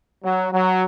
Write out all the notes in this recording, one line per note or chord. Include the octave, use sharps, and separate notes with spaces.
F#3
F#3